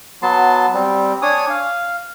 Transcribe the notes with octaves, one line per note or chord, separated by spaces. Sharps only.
F#3 B3 A5 C6
G3 C4
D4 C#5 G#5 D#6
F5